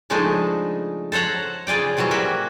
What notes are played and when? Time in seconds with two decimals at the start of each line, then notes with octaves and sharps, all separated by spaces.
0.10 C#3 F3 G#3 A3 D4 D#4
1.12 A4 C5 C#5 F#5 A#5
1.67 C#3 F4 G#4 D5 G5
1.97 C3 E3 F#3 G3 C4
2.11 A#3 C#4 F#4 E5 G5